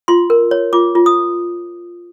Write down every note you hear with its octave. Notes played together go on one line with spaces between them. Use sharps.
F4 C6
A#4
C#5
F4 D6
F4
D#6